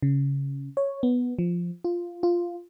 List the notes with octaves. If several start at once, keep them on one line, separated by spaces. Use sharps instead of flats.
C#3
C#5
B3
F3
F4
F4